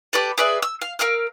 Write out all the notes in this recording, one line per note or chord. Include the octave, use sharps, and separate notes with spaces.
G4 A4 B4 D5
G#4 B4 D5 E5
E6
F5
A#4 F5 E6 F6